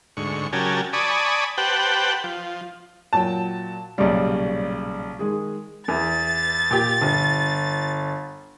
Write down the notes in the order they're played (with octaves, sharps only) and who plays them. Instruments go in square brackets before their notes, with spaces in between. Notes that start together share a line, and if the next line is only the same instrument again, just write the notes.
[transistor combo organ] D2 G#2 C#6
C#3 F#3 G4 A#4 G#5 A5
D5 G#5 A5 B5 C#6 D#6
G4 B4 C5 F#5 G5 A5
F3
[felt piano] A#2 F#3 G5 [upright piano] A5
[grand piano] B1 A#2 C#3 [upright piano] G3 [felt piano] G4 D5 D#5
[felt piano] D#3 G#3 G#4
[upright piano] E2 [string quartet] A6
[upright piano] A#2 G4
G1